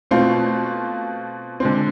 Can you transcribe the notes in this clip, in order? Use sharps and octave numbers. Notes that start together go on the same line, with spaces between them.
B2 A3 C4 F4
D3 G#3 C4